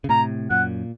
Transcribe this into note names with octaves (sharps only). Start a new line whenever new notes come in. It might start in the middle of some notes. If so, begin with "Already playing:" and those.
C#3
A2 C3 A#5
F#2 A#2 F#5